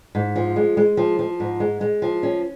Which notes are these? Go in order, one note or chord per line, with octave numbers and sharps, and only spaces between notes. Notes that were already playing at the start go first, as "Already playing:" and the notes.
G#2
F3
G#3
G#3
F3
F3
G#2
G#3
G#3
F3
C#4